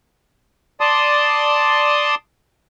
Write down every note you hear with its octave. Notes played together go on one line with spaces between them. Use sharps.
D5 A5 C6 D#6